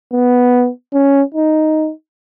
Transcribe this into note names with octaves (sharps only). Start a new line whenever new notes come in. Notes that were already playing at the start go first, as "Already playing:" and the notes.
B3
C#4
D#4